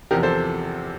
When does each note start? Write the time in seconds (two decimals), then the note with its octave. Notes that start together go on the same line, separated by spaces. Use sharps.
0.11 E2 C3 F3 G4 A#4
0.23 A4 C5